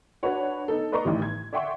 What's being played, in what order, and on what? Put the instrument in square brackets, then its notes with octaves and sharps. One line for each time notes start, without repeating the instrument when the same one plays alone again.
[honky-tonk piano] D4 F#4 B4 C#5 F#5
B3 D#4 A4
B4 D5 D#5 A#5 C6 C#6
A1 D#3 E3 G3
G#6
D5 E5 F#5 G5 C6 C#6